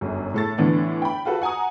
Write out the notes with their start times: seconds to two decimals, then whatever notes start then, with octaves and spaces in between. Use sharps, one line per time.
0.01 G1 F#2
0.34 A2 A4 A6
0.58 A2 D3 E3 B3 D4
1.02 G5 B5
1.25 F4 F#4 A4 B4
1.42 F#5 G#5 A#5 D#6